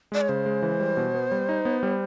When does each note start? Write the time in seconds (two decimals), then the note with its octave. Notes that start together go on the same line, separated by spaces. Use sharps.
0.12 G#3 D5
0.21 C#5
0.29 C#3 C5
0.46 G#3
0.62 E3
0.80 G3
0.97 B2
1.14 B3
1.31 G3
1.49 D#4
1.65 B3
1.83 G3